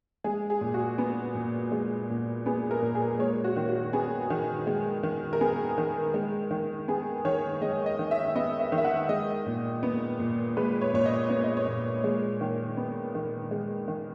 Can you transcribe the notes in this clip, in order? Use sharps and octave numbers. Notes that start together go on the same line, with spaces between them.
G#3 G#4
G#4
A#2
F#4
B3
A#2
G#3
A#2
B3 G#4
A#4
A#2
G#4
G#3 C#5
F#4
D#3
F#4
B3 G#4
D#3
G#3
D#3
A#4
B3 G#4
D#3
G#3
D#3
B3 G#4
D#3 C#5
G#3 D#5
D#5
D#3
E5
B3 D#5
E5
D#3
E5
F#5
G#3 D#5
A#2
B3
A#2
G#3 B4
C#5
A#2 C#5
D#5
B3 C#5
D#5
C#5
A#2
G#3
D#3
B3
D#3
G#3
D#3